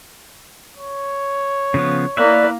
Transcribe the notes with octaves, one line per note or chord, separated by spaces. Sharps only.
C#5
C#3 F3 B3
A#3 E4 B4 D5 E5